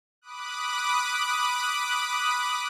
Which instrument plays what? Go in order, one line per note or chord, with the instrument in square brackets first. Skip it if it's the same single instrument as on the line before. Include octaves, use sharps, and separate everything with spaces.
[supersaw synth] B5 D6 D#6 F#6